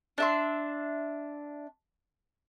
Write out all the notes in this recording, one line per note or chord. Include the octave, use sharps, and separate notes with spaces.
D4 E5 C6